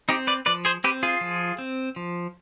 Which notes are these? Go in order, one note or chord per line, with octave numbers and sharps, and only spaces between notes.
C4 D#4 G4
B4 D5
F3 B4 D5
G#4 C5
C4 G4 B4
F4 G#4
F3
C4
F3